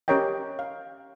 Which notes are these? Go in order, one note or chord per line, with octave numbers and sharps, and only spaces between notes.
C#4 G4 A#4 C#5 D#5 G5
F5